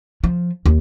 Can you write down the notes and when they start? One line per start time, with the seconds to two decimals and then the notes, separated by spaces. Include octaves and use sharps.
0.24 F3
0.66 D#2